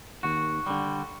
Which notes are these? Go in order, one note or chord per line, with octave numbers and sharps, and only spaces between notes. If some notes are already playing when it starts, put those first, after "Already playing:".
D#2 F#4
D3 G3